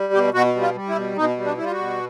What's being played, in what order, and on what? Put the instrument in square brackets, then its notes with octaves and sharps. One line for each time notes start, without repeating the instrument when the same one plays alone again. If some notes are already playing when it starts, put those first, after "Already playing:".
Already playing: [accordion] G3
B2 G4
B2 F#4
G3
F4
G3
E4
B2
B2 D#4
G3
D4
G3 E4
F4
F#4
B2